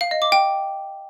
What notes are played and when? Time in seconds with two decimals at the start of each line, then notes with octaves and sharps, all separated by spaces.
0.01 F5
0.11 D#5
0.22 D6
0.32 G5